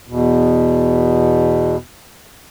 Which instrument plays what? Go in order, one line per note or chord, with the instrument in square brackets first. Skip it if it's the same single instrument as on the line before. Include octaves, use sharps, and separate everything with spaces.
[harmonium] E2 B2